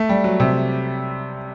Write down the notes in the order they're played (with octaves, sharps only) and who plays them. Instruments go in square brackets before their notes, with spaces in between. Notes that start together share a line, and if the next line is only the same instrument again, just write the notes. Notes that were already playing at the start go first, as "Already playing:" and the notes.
Already playing: [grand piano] A3
G3
F#3
C3